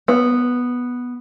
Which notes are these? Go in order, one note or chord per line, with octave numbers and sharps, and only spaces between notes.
B3